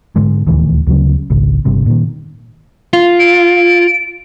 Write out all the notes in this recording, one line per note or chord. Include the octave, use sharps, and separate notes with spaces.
G#2 D3 G#3
D#1 D2 D#3 E3
D2 C#3 F#3 C#4
G#1 C#2
G1 G2 C3
A#2 D#3
F4
D7